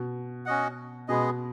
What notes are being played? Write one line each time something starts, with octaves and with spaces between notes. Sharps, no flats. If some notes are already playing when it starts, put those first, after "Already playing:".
Already playing: B2
C#4 F#4 D#5 F#5
B2 G#3 B3 G#4 D#5